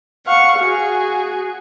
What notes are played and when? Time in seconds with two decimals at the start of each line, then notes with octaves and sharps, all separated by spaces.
0.24 F5 F#5 C#6
0.58 F#4 G#4